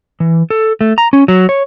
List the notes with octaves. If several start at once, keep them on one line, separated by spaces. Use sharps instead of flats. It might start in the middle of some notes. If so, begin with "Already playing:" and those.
E3
A4
A3
A#5
C#4
F#3
C#5